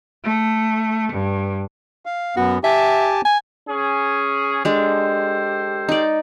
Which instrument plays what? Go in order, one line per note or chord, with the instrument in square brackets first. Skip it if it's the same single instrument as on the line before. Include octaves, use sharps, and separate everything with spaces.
[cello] A3
G2
[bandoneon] F5
[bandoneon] F#2 B3 [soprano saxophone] F#4
[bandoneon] G4 G#5 A5 [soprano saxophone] E5
[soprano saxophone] G#5
[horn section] C#4 G#4
[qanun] G#3 D4 [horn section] G4 A4 C5
[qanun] D#4 D5